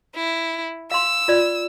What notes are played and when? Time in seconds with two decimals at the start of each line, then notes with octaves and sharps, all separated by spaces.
0.16 E4
0.91 F5 C6 E6
1.28 F4 D5